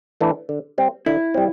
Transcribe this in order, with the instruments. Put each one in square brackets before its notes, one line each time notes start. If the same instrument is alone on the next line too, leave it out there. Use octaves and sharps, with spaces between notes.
[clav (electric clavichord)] E3 A3 D4
D3
G3 C4
[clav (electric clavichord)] D3 [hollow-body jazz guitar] E4
[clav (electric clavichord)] G3 C4